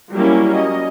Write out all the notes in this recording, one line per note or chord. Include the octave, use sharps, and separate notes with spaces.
F#3 G3 A#3 C#4 E4
D#5